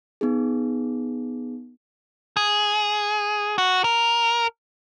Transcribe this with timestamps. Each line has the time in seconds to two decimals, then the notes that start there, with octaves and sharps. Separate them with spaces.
0.21 B3 D#4 G#4
2.37 G#4
3.58 F#4
3.84 A#4